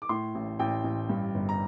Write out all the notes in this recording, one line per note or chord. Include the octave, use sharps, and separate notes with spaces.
D6
A2 C6
A1
A1 G5
A1
G2
G1
A#5